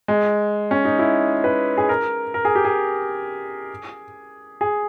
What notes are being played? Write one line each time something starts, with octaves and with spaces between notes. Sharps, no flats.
G#3
C#4
D#4
E4
B4
G#4
A#4
A#4
G#4
G4
G#4
G#4